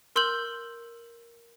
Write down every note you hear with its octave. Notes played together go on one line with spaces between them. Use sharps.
A#4 C6 E6 G6 F#7